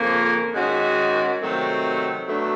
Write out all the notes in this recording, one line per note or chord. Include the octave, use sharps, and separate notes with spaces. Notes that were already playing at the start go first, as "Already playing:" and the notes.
Already playing: F2 C#3 F3 A#3
G#2 D#3 G#3 C#4 F#4
C3 D#3 F#3 A3 C4
B2 F#3 A3 D4